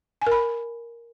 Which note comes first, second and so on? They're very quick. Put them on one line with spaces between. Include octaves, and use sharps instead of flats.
G#5 A#4 B5